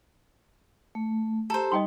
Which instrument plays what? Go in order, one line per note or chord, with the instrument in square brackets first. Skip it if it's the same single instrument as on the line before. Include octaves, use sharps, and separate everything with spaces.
[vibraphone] A3
[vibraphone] G4 A#5 [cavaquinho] A4 C5
[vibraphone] G3 D#4 [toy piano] D#5 G5 C6